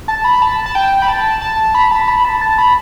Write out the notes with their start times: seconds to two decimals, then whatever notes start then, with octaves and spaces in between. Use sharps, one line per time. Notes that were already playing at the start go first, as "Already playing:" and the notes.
0.08 A5
0.24 B5
0.42 A5
0.66 A5
0.75 G5
1.02 B5
1.08 A5
1.41 A5
1.75 B5
1.91 A5
2.08 B5
2.25 A5
2.41 A5
2.58 B5